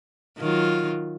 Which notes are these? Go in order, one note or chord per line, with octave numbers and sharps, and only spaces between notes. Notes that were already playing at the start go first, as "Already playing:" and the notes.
D#3 F#3 F4